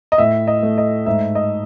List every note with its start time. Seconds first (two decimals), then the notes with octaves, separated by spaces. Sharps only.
0.12 D#5
0.18 A2 E5
0.48 D#5
0.63 A3
0.78 D#5
1.06 G#2 E5
1.35 D#5